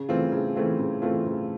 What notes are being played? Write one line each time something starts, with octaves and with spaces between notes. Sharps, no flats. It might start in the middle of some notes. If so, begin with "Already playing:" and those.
Already playing: C#3
E3 A3 C4 F4
C#3
E3 A3 C4 F4
C#3
E3 A3 C4 F4
C#3